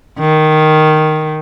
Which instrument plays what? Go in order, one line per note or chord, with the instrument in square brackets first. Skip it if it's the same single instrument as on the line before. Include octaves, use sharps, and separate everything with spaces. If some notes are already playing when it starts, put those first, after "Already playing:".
[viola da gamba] D#3